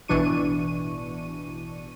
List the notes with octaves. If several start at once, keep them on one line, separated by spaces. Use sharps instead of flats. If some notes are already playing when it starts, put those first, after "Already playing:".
A1 B2 E3 D4 C#6 D#7